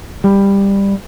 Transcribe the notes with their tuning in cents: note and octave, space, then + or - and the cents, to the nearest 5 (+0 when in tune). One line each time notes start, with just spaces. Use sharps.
G3 +15